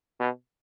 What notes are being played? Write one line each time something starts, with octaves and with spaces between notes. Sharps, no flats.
B2